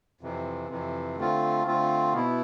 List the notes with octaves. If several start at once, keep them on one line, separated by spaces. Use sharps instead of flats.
F2 C3 E3
F2 C3 E3
D3 A3 C4 F4
D3 A3 C4 F4
B2 B3 E4